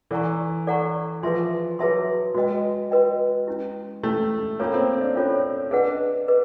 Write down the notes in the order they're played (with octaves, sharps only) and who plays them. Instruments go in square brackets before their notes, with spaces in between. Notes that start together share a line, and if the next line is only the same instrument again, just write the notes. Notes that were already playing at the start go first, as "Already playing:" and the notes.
[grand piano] E3 [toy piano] A4 D5 F#5 A#5 C#6
[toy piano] A4 D5 F#5 A#5 C#6
[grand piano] F3 [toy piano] G#4 B4 E5 A5 C6
[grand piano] F#3 [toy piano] G#4 B4 E5 A5 C6
[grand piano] G#3 [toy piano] F#4 B4 D#5 G5
[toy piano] F#4 B4 D#5 G5
C#4 E4 G4
[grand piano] A3 [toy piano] C#4 E4 G4
[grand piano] A#3 [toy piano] C#4 F4 A4 C#5
[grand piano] C4
D4
[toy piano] C#4 F4 A4 C#5
[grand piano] D4 [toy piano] G#4 B4 D#5 F#5
[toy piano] G#4 B4 D#5